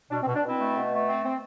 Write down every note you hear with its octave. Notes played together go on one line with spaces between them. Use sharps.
B2 D4
C4
B2
D4
B2 C4 E4
A3
B2
A3
C4
C4